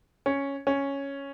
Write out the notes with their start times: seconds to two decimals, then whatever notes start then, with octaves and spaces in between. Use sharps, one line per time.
0.26 C#4
0.67 C#4